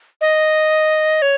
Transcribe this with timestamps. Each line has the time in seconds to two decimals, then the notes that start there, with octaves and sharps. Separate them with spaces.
0.21 D#5
1.22 C#5